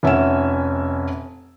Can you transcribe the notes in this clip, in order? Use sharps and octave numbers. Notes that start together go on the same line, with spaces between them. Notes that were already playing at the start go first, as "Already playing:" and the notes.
F1 C#4 E5 F#5 G#5 E7